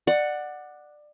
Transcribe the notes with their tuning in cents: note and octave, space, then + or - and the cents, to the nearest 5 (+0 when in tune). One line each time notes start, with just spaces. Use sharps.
D5 +20 F#5 +0